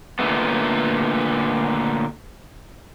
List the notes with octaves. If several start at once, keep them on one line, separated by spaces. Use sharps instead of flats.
A#2 D3 A3 B3